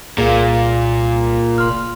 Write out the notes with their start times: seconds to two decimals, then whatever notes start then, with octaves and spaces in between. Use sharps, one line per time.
0.18 C2 A#2 G#4 F5
1.58 F1 C6 F6